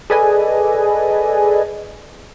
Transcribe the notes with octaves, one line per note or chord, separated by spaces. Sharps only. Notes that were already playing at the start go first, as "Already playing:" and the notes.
G#4 A4 B4 D5 D#5 G#5